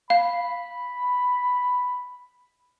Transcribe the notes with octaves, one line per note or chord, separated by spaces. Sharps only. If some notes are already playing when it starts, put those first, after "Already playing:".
F5 B5